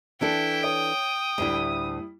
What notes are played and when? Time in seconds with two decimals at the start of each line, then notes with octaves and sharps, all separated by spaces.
0.21 E3 D4 E4 A4 G5
0.63 C#5 D#6 D7
1.38 D2 A2 G3 D4 E4